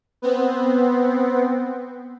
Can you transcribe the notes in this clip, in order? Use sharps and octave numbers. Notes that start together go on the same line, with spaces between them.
B3 C4